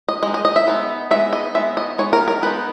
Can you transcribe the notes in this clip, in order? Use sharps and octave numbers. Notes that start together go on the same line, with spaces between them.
D#5
G#3 D#4 D#5
D#5
D#5
E5
G#3 B3 D#4
G#3 B3 D#4 E5
D#5
G#3 B3 D#4 E5
D#5
G#3 B3 D#4 C#5
A#4
A#4
G#3 B3 D#4 B4